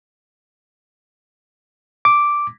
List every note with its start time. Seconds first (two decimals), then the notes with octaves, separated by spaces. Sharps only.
2.05 D6